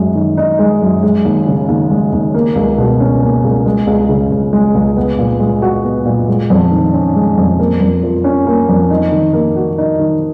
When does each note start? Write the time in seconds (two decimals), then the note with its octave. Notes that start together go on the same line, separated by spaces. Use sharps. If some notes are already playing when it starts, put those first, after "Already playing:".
Already playing: F#2 G#3
0.15 D#3
0.37 D#4
0.59 G#3
0.82 F#2
1.03 G#3
1.25 D#2
1.47 C#3
1.68 D#2
1.90 G#3
2.13 D#2
2.34 A#3
2.56 C#2
2.78 B2
3.00 C#4
3.22 A#3
3.43 C#2
3.66 G#3
3.87 C#2
4.09 C#3
4.31 C#2
4.53 G#3
4.75 C#2
4.96 B3
5.19 A#2
5.40 G#3
5.62 F#4
5.84 B3
6.05 A#2
6.28 G#3
6.50 F2
6.71 D#3
6.93 C#4
7.15 G#3
7.38 F2
7.59 A#3
7.80 F2
8.03 F3
8.24 C#4
8.47 A#3
8.69 F2
8.90 D#4
9.12 D#3
9.33 A#3
9.56 F#4
9.78 D#4
9.99 D#3